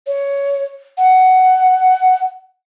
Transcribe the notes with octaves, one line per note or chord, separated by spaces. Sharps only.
C#5
F#5